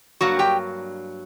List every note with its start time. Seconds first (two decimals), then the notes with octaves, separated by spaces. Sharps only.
0.21 G2 F#3 A#3 F#4 F#5
0.39 G4 G5